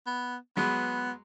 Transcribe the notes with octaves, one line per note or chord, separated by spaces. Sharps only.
B3
F#3 G#3 B3 B4